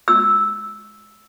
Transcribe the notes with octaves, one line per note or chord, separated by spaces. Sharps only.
E6